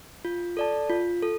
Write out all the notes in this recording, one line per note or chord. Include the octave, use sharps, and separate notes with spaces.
F4
A4 D5 A5
F4
A4